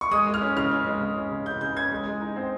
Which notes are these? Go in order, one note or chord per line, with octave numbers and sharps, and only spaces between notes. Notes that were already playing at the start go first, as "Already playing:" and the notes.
C#6
G#3 D#6
G#3
F6
C#4
C#3 F6
C#4
G#3
C#3
C#4
C#3
C#3 G6
C#3 G6
C#4 G#6
G#3
G#3
D#4
C4